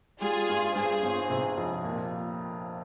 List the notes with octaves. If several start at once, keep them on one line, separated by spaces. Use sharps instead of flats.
G3 F4 G#4
G2
G2 G#4 C5
G1
C3
F2
A#2